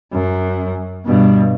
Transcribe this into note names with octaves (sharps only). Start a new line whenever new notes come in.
F#2
G2 B2